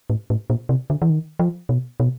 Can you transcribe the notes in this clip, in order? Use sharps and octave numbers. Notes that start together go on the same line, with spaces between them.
A2
A2
A#2
C3
D3
E3
D#3
F3
B2
B2